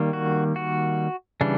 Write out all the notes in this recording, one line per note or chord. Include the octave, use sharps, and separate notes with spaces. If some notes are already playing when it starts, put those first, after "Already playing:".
Already playing: D#3 G3 A#3
F#4
F#4
C#3 E3 G3 D4